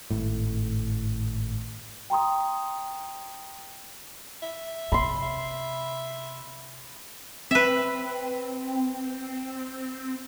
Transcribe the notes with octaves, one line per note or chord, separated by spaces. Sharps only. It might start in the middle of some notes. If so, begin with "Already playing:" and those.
G#1 A2
G5 A#5 C6 D#6
E5
C3 B5 C6
E5
C4 B4 E5